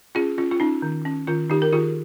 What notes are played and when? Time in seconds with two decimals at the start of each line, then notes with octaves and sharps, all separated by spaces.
0.15 C#4 F4 G#4
0.38 C#4 F4
0.51 F4
0.60 C#4 D#4
0.82 D#3
1.05 C#4
1.27 D#3 F4
1.50 D#3 D#4 G4
1.62 A#4
1.73 D#3 F4 G#4